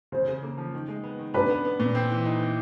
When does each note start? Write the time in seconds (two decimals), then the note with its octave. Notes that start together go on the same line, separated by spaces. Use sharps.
0.12 C#3 C5
0.28 C#3
0.43 A#3
0.58 F3
0.74 D#3
0.88 G#3
1.04 B3
1.19 D#3
1.34 D4 B4
1.50 B3
1.65 B3
1.80 A#2
1.95 C4
2.10 E3
2.26 D#4
2.40 E3